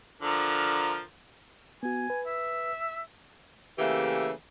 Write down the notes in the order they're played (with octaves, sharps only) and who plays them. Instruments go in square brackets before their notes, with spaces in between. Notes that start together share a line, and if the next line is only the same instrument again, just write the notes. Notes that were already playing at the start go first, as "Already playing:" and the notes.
[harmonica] D3 F3 A#4
[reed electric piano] B3 F#4 [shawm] G#5
[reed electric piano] B4
[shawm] E5
[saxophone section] C#3 E3 A3 A#3 G4